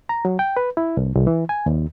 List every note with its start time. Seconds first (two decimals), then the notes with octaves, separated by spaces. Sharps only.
0.09 A#5
0.25 F#3
0.39 G5
0.57 B4
0.77 E4
0.97 C2
1.15 C2
1.27 E3
1.49 G#5
1.66 D#2